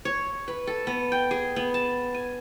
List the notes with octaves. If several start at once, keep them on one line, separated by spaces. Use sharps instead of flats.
C#5
B4
A4
B3
G5
G#4
B3
A5
G#5